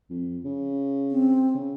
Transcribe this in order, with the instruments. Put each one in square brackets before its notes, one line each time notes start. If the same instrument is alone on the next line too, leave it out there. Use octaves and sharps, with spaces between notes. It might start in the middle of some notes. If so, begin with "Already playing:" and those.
[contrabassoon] F2
C#3
[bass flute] C4
[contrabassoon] C#3